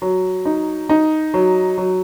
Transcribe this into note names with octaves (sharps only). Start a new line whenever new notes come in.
F#3
D#4
D#4
F#3
F#3